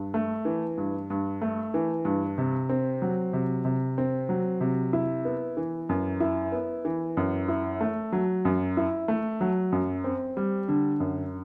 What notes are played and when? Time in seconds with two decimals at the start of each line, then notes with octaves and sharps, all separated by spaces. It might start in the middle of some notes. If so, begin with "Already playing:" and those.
Already playing: G2
0.14 A3
0.45 E3
0.77 G2
1.10 G2
1.42 A3
1.74 E3
2.05 G2
2.38 C3
2.69 C4
3.02 F#3
3.33 C3
3.65 C3
3.98 C4
4.29 F#3
4.61 C3
4.93 E4
5.25 B3
5.57 E3
5.89 F#2
6.20 E4
6.52 B3
6.85 E3
7.17 F#2
7.48 E4
7.81 A3
8.12 F#3
8.45 F#2
8.77 E4
9.08 A3
9.41 F#3
9.72 F#2
10.04 C4
10.37 G3
10.68 D3
11.00 F#2